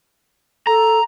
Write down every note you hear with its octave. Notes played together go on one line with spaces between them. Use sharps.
A4 A#5